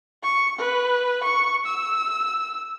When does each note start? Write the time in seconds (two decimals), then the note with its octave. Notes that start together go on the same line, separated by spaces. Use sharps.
0.23 C#6
0.59 B4
1.24 C#6
1.66 E6